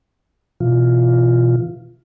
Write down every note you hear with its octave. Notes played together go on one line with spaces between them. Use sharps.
B2 E3 F4